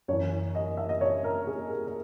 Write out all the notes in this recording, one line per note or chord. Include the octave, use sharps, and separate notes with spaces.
F#2 E3 C#5
D#5
E5
D#5
C#5
A#4
G#4
A#4
A#4